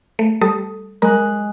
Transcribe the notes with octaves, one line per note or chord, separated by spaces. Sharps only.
A3
G3 A4 D#6
G#3 A#4 F#6